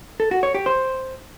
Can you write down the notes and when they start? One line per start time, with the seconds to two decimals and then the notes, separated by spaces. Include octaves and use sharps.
0.20 A4
0.31 F#4
0.43 C#5
0.55 G4
0.66 C5